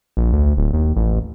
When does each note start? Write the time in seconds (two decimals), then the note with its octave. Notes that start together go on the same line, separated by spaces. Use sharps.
0.17 A#1
0.33 D2
0.57 D1
0.73 D#2
0.96 A1